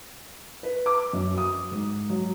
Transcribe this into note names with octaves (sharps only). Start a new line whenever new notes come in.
B4
D6
F#2
D#6
G#2
F#3